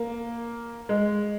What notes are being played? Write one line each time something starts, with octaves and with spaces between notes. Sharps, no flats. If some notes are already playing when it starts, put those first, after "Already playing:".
Already playing: A#3
G#3